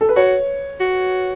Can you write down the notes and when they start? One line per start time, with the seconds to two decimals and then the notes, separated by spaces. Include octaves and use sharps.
0.01 A4
0.09 B4
0.16 F#4 C#5
0.80 F#4